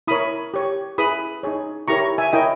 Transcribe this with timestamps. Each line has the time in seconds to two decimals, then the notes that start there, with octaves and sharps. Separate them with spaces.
0.08 E4 A#4 C#5 B5 D#6
0.54 G4 C#5
0.98 E4 G#4 B4 B5 D#6
1.43 D#4 G#4 C#5
1.88 E4 G4 A#4 C#5 A#5 C#6
2.18 E5 G#5
2.33 E4 A#4 C#5 D#5 G5